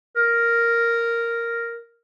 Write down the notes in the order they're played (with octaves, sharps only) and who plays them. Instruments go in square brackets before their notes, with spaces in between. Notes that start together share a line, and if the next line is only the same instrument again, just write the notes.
[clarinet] A#4